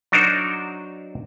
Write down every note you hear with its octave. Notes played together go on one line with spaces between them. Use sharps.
F#3 D4 D#4 F#4 A#4 C5